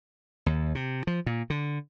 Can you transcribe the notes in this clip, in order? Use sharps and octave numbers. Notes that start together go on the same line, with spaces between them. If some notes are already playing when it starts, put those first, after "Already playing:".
D#2
C3
F3
A#2
D3